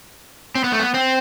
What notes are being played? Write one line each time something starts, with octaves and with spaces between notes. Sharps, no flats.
C4
B3
A3
B3
C4